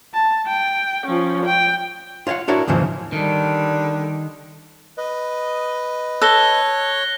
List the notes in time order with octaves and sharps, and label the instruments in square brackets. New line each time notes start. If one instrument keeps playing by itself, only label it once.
[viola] A5
G5
F3 C#4
G5
[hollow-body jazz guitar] F4 C#5 D#5 F5 F#5
D4 E4 F#4 A#4 C#5 D5
D#2 G#2 C#3 E3 F3
[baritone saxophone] D3 [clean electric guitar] D#3 [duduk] G3
[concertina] B4 D#5
[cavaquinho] A4 [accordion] C#5 [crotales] F#6 A#6 G7